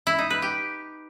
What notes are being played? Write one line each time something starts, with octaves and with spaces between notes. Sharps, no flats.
E4
D#4
B4
G4